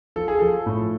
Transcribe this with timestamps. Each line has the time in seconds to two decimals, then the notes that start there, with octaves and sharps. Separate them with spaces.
0.16 F3 A4
0.28 G#4
0.39 F3 A4
0.66 A2